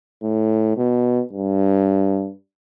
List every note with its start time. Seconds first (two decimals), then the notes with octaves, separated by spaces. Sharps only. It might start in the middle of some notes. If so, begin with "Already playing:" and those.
0.23 A2
0.77 B2
1.33 G2